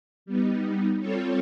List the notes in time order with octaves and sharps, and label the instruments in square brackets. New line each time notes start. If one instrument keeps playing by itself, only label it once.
[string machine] G3 B3 D#4
G3 C4 F4 A4 C#5